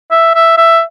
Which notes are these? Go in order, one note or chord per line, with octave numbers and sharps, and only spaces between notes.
E5
E5
E5